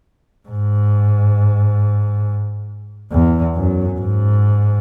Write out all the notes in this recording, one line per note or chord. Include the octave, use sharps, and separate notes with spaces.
G#2
E2
F#2
G#2